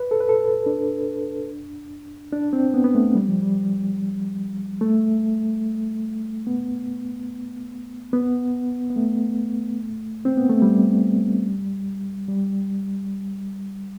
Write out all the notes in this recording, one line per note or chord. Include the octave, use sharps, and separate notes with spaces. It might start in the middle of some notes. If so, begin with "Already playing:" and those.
Already playing: B4
A4
B4
A4
D4
D4
C4
B3
B3
A3
G3
F3
G3
A3
B3
B3
B3
A3
C4
B3
A3
G3
G3